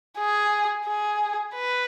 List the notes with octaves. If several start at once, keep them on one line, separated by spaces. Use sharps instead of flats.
G#4
G#4
B4